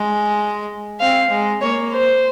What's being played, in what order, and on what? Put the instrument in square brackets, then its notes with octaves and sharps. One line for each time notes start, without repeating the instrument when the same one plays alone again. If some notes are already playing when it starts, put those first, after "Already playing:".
Already playing: [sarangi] G#3
[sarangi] C4 [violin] F5
[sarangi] G#3
[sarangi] A#3 [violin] C#5
[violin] C5